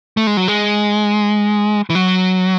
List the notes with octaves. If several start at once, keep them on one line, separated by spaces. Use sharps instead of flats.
A3
G#3
F#3
G#3
E3
F#3